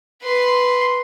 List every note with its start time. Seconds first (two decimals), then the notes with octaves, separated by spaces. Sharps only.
0.22 B4 C6